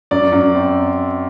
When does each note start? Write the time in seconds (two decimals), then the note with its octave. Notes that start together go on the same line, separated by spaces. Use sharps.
0.11 F#2 D5
0.32 F#2
0.55 C4